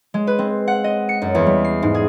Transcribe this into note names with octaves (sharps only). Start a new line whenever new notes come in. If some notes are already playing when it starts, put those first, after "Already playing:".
G#3
B4
C4
F#5
D#5
C#7
F#2
E2
G3
C7
G#2
G#4